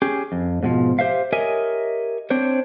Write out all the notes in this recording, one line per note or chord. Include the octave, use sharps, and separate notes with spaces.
C#4 G4 G#4
F2
G#2 B2 F3
G4 C5 E5 F5
G4 A#4 C#5 D#5 E5 G#5
C4 D4 C5 C#5